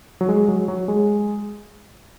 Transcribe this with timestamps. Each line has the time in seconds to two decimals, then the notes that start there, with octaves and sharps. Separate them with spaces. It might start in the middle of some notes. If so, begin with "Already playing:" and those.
0.21 F#3
0.29 G#3
0.48 F#3
0.68 F#3
0.88 G#3